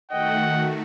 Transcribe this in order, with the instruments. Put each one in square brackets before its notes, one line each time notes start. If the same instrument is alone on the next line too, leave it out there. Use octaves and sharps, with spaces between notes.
[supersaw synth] D#3 A3 F#4 [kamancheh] D#5 G5 [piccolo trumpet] F#5